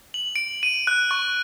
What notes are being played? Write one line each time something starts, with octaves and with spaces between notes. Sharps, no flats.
F#7
D7
D#7
F#6
C#6